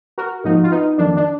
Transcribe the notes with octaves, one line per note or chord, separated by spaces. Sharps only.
F#4 A#4
G#2 F3 A#3 D#4 F#4
F4
B3 D#4
F2 D#3 F#3 A#3 D4
D4